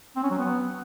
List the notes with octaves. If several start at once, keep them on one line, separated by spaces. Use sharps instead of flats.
C4
C#4
F#3
B3